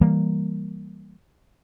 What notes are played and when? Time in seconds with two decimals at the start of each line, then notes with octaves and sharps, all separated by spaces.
0.01 E3 G3 A#3